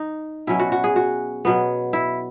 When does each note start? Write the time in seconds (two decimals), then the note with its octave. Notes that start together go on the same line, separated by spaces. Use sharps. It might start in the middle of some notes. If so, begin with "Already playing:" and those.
Already playing: D#4
0.47 B2 F#3 C#4 E4
0.59 F#4
0.72 F#4
0.84 G#4
0.96 F#4
1.45 B2 F#3 B3
1.93 E4